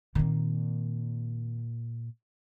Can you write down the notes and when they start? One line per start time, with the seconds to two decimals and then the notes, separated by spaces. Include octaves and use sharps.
0.15 A#2 D#3 A#3 C4